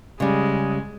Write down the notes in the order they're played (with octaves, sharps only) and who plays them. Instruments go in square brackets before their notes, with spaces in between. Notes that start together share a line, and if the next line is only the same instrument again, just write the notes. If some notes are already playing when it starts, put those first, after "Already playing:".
[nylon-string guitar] C#3 G3 [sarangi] G#3